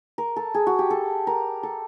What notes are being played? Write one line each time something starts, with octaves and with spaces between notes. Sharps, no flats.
A#4
A4
G#4
F#4
G4
A4
A#4
A4